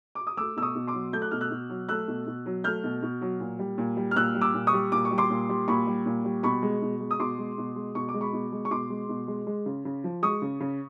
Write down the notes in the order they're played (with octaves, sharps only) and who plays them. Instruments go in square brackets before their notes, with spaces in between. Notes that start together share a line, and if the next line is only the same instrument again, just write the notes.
[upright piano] D6
D#6
A3 D6 E6
B2 E6
C#6 D#6
B2
C6 D6
F#3
A3 G6
F#6
B2 F6
E6 F#6
B2
F#3
A3 E6 F#6
B2
B2
F#3
A3 F6 G6
B2
B2
F#3
A#2
G3
A#2
G3
F6
A#2 E6 F#6
G3
D6 E6
A#2
C#6 D#6
G3
A#2 D6
C#6
G3
C6 D6
A#2
G3
A#2 B5 C#6
G3
A#2
G3
B2 B5 C#6
G#3
B2
G#3
D#6
B2 C6 D6
G#3
B2
G#3
B2 C#6
D6
G#3
B5 C#6
B2
G#3
C#6
B2 C6 D6
G#3
B2
G#3
G#3
C#3
C#3
F3
G#3 C#6 D#6
C#3
C#3